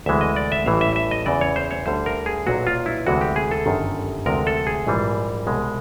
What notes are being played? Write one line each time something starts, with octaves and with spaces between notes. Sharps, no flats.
D2 C3 E3 G#3 E5
D#5
D5
E5
A1 A2 E3 G3 F5
E5
E5
D#5
E2 C#3 E3 D5
C#5
C5
C#5
D2 D3 G3 C5
A#4
G#4
B1 A#2 F#3 F#4
F4
E4
D2 C3 E3 G#3 F#4
G4
G#4
A4
G1 F#2 D#3
D2 C3 F3 G#3 A#4
A4
G#4
A#1 G#2 E3 G3
C2 B2 G#3